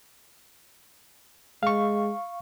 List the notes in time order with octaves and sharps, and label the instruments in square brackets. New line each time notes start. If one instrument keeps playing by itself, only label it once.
[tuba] G#3 [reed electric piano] F5 C#6